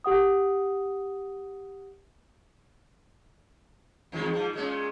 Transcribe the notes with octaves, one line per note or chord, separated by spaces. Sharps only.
G4 F#5 D#6
E2 D#3 G#3
G#2 F3
A#2 G#3 C#4